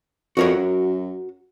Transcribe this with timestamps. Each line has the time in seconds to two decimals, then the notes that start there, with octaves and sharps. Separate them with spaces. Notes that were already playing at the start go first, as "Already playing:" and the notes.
0.37 F2 F#4 A#4 C#5
0.56 F#2